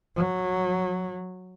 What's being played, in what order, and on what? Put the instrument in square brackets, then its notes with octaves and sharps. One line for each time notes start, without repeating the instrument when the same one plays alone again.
[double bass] F#3